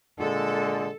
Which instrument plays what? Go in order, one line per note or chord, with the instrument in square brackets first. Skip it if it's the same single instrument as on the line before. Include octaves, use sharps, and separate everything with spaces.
[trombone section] A#2 D3 G#3 [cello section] A4